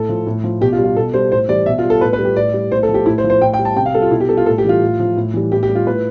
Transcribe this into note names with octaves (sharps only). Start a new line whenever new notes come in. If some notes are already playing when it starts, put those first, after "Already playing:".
Already playing: A2 A4
F3
A2
F3
B2 G4
F4
G3
F4
B2 A4
G3 C5
A2 C5
E3 G3 D5
B2 E5
F4
G3
A4
A2 B4
B4
G3
G4
A2 D5
G3
A2 C5
A4
F3
G4
A2 E4
C5
F3
C5
A2 G5
G5
G3
A5
C3 G5
F5
G3 A4
F4
B2 E4
G4
G3 A4
F4
A2 A4
G4
E3 G3 F4
A2
F3
A2
E3 G3
A2 G4
G4
G3
F4
A2 B4